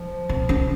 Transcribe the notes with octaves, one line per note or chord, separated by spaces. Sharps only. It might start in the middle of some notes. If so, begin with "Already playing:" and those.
Already playing: F3
C3
C#3